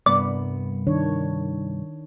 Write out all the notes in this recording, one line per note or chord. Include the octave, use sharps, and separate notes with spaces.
C2 G2 B3 D5
D#3 D4 C#5